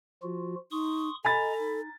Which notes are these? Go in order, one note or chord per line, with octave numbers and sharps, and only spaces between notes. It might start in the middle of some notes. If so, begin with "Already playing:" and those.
F3 F4 F#4
D#4 C6 C#6 D#6
A4 D#5 G#5 A#5 B5 A6
D#4